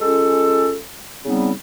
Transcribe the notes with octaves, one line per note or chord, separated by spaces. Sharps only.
G#3 C#4 F4 A4
C#3 G3 B3 C4 D#4